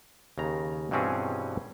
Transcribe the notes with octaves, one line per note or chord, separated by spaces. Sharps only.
D#2 C#3 A#5
G2 B2 E3 C4 C#4 G#4